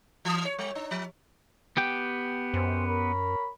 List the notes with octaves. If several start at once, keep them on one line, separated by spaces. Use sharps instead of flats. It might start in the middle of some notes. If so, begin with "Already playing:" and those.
E3
C#5
G3
D4
F3
B3 G4 G5
F#2 C4 C#4 C5
A#4 C#5 B5